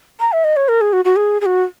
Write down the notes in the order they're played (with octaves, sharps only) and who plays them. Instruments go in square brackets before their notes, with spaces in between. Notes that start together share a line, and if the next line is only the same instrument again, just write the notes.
[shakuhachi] A#5
E5
D#5
C#5
A#4
G#4
F#4
F#4
G#4
G#4
F#4